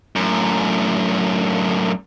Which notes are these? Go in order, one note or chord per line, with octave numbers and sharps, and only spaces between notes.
F#2 A2